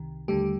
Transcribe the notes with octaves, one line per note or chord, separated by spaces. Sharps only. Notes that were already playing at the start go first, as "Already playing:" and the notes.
Already playing: C2 C3 D#3
D#2 D3 G3 A3 G4